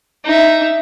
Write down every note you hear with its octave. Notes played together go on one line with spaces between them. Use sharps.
D#4 E5